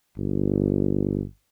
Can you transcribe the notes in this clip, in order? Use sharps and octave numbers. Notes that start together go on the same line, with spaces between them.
G1